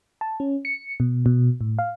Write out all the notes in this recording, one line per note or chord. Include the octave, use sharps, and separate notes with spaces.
A5
C#4
C#7
B2
B2
A2
F5